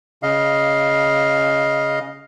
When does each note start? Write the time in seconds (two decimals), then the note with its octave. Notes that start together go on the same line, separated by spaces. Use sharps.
0.23 C#3 D#5 F5